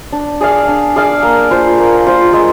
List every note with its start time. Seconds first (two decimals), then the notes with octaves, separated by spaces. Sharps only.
0.12 D4
0.41 G#4 D5 F5
0.68 D4
0.96 G#4 D5 F5
1.23 A#3
1.51 F4 C5
1.78 A#3
2.07 F4 C5
2.33 G#3